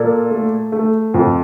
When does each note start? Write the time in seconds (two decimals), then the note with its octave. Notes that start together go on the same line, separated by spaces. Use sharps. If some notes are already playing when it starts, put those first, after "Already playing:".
Already playing: A#2 A4 A#4 D5
0.30 A3
0.72 A3
1.14 F2